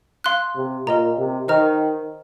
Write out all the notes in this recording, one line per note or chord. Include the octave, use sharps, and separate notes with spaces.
F5 C6 F#6
C3
A#2 A#4 D#5 A#5
C3
D#3 C5 D#5 A#5 F6